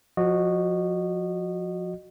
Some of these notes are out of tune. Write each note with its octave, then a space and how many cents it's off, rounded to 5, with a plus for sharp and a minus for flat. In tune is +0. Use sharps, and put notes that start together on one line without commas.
F3 +20 F#4 -5 D#5 -20